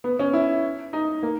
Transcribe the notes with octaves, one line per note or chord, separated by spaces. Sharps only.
B3
C#4
E4
D#4
A#3